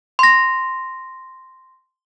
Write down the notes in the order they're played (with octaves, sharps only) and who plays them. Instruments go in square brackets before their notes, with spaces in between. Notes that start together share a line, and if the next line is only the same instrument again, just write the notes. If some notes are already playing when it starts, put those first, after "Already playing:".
[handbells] C6 A#6